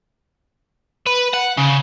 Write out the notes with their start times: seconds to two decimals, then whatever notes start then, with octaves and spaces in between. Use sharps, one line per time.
1.06 B4
1.33 F#5
1.57 C#3